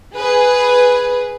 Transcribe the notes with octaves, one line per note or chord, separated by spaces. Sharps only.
G#4 B4